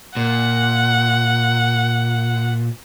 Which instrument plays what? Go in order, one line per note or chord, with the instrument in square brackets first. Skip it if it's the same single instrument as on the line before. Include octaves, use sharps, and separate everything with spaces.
[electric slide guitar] A#2 [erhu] F#5